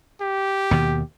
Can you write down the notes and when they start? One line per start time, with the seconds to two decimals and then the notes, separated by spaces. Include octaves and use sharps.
0.21 G4
0.71 D#2 B2 D#3